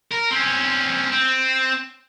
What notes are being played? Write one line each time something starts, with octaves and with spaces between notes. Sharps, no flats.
A#4
C4 C#4
C4